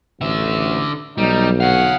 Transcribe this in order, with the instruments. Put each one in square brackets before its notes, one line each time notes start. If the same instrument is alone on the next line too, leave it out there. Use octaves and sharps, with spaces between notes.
[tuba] A1 [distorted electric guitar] D3 E5
[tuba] B1 [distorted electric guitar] G3 [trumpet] D#4
[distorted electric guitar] C#5 F5 [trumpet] F#5